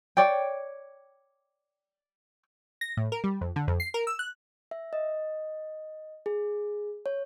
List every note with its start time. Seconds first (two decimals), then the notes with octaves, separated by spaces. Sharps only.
0.17 C#5 D5 G5
2.81 A#6
2.97 A2
3.12 A#4
3.24 G3
3.41 F2
3.56 D3
3.67 F2
3.80 C7
3.94 A#4
4.07 E6
4.19 F#6
4.71 E5
4.93 D#5
6.26 G#4
7.06 C#5